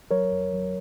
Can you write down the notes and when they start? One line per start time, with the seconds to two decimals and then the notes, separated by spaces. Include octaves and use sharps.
0.11 F#3 A#4 C#5
0.31 F2
0.53 F#3